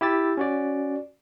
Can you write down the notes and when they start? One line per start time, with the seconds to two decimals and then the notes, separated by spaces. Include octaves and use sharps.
0.01 E4 G4 E6 A6
0.37 C#4 F#4 D5